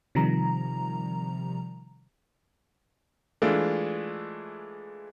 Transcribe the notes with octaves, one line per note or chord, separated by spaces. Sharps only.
C3 D#3 F3 G3 A#5
E3 G#3 A3 D4 F4